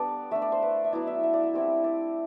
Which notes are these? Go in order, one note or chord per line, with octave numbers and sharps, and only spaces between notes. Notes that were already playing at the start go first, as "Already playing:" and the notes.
Already playing: G3 B3 D4 A4 B4 D5
A3 D4 E5
D5
C5
B4
E5
F#3 B3 E4 D5
E5
E5
D5
E5
G3 C4 E4
D5